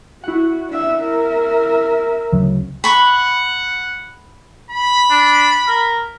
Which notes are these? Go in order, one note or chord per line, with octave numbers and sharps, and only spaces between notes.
E4 F#4 F#5
D4 E5
A#4 E5
D2 C#3 F#3
F#5 B5 C#6
B5
D4
A#4